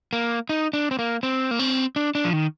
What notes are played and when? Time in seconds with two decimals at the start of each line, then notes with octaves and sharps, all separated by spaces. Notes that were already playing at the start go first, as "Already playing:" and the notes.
0.13 A#3
0.49 D#4
0.73 D4
0.91 C4
0.99 A#3
1.23 C4
1.51 A#3
1.59 C4
1.96 D4
2.15 D4
2.25 F3
2.33 D#3